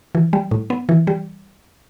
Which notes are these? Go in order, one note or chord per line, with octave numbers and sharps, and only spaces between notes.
E3
G3
A2
B3
E3
G3